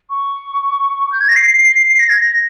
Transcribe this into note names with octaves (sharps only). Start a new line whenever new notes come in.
C#6
G6
G#6
A#6
C7
C7
C7
C7
C7
A#6
G#6
A#6